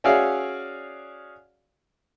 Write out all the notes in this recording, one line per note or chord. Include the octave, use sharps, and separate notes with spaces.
C#4 F#4 G#4 D5 E5 F5